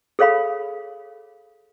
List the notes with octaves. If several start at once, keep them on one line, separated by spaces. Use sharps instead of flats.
G#4 A4 C#5 F5 B5